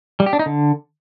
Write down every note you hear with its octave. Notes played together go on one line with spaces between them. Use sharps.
G3
G4
D4
D#4
D3